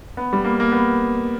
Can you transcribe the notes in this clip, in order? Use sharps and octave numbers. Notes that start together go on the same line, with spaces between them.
B3
G3
A#3
A#3
B3